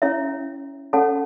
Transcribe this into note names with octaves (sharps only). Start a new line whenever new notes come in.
C#4 E4 C#5 E5
C#4 A4 C#5 F#5 A5